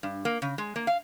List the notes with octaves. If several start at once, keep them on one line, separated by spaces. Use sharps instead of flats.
G2
A#3
C#3
G#3
A#3
F5